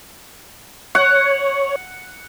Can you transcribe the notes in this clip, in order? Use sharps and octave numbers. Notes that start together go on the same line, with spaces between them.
C#5 F#5